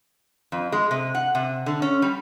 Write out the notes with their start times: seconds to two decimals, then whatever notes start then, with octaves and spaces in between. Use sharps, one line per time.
0.52 F2
0.72 G#3
0.91 C3
1.15 F#5
1.35 C3
1.66 D3
1.82 C#4
2.02 G3